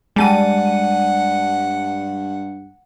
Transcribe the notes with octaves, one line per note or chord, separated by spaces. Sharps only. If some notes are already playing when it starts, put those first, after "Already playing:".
G2 G3 G#3 F#5 A5 D#7